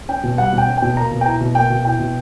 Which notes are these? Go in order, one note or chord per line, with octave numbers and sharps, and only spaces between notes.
C#4 G5
B2
G3 F#5
B2
G5
C#4
B2 G5
A#3 A#5
B2
G5
E4 A#5
B2
A#3 G5
B2
E4 G5
B2